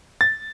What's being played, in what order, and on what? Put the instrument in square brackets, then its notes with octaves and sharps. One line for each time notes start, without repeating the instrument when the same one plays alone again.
[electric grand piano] A6